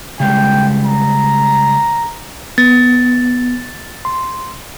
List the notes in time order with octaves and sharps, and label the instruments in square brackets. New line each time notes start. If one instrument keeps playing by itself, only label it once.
[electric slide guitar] C#3 G3 G#3 [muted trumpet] G5
[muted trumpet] A#5
[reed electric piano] B3 [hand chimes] A6
[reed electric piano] C6